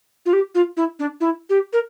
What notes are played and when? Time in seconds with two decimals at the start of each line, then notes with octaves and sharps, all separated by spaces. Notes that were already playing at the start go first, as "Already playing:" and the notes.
0.26 F4
0.33 G4
0.55 F4
0.77 E4
0.99 D4
1.21 E4
1.50 G4
1.73 A#4